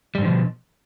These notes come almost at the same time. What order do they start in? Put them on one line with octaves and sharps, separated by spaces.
G3 G#2 D3 F3 B2